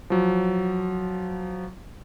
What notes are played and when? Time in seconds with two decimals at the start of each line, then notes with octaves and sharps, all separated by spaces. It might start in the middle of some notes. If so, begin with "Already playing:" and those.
0.10 F3 F#3